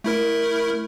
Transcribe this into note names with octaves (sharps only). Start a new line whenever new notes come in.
A3 E4 A#4